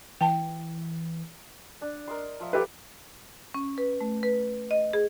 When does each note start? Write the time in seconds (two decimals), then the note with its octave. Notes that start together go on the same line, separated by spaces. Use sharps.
0.21 E3 G5 A5
1.81 D4
2.08 A#4 D#5 C6
2.40 F3 E5
2.53 G4 A4 B4
3.54 C#4
3.78 B4
4.01 A3
4.23 B4
4.71 D#5
4.93 G#4